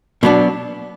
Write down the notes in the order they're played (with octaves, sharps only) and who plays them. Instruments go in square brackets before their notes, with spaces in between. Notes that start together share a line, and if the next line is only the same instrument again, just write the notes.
[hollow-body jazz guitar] B2 F#3 B3 D4